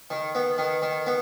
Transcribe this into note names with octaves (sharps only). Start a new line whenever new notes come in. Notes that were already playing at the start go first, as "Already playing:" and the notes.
D#3
B3
D#3
D#3
B3